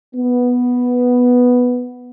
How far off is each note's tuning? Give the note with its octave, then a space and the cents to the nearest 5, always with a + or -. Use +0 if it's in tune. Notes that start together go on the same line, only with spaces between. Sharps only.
B3 +0